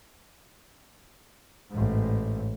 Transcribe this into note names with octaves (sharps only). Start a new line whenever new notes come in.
A1 G#2